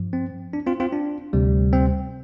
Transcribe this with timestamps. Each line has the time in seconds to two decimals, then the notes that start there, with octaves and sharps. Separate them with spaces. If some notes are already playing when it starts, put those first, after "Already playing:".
Already playing: G2 F3
0.13 C4
0.53 D4
0.67 C4 F4
0.80 C4 F4
0.93 D4
1.33 D2 C3 G3
1.73 C4